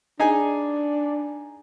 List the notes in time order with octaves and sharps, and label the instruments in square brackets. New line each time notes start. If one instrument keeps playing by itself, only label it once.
[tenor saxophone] D4 [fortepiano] D#4 G#4 G#5